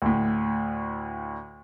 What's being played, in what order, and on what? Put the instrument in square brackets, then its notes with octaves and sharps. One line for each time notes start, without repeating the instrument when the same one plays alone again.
[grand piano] D2 A2